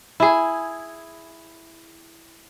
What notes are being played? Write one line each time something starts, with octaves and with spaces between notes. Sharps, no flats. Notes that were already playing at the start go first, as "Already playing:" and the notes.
E4 G#4